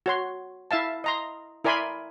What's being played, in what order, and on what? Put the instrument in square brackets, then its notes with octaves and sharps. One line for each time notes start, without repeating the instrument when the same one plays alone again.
[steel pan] F#4 C#5 C6
E4 E5 F5 A5
D#5 A#5 C6
E4 A#4 D5 G#5 B5 C6